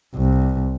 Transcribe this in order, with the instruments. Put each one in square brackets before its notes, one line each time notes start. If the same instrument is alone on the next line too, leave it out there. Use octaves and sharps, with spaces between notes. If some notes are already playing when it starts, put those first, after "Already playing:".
[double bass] C2